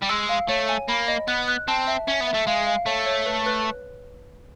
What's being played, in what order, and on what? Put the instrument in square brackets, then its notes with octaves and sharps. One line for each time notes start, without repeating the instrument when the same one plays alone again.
[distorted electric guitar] G3
[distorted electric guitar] G#3 [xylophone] E6
[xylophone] F5
[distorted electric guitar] A3 [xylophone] C#5
[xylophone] G#5
[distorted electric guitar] A#3 [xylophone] B5
[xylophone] D#5
[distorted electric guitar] B3 [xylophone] F#6
[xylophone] F#6
[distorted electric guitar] C4 [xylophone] A5
[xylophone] E5
[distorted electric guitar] C#4 [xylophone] E5
[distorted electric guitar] B3
[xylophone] E5
[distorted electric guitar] A3
[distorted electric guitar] G#3 [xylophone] F5
[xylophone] F5
[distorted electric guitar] A3 [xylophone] C#5
[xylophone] C#5
B4
B4